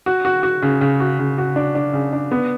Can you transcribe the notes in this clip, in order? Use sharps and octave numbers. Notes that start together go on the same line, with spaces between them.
F#4
F#4
F#4
C#3
C#3
F#4
C#3
F#4
D4
D4
C#3
D4
B3